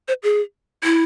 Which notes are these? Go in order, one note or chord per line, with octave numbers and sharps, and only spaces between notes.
C5
G#4
E4